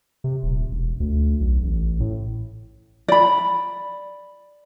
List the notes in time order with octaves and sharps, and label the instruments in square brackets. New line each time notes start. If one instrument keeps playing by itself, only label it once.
[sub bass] C3
D#1
E1
D2
B1
A1
A2
[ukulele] D5 B5